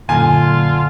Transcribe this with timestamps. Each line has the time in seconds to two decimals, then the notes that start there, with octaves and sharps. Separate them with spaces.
0.09 F#2 A#2 D3 F4 G#5